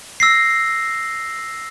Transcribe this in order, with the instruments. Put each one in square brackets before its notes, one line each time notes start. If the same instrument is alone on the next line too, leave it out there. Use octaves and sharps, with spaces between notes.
[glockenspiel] E6 A#6 C7